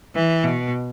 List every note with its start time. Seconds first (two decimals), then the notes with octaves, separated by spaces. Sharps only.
0.15 E3
0.44 B2